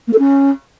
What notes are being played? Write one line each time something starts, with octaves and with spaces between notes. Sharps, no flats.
A#3
A4
C#4